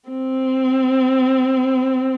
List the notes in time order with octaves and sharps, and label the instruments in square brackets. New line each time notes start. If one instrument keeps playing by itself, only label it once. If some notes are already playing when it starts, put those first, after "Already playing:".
[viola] C4